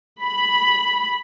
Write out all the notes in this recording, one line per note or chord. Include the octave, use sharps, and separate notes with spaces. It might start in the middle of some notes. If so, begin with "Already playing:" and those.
B5